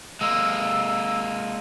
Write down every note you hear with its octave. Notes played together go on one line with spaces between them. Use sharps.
G#3 A#3 E6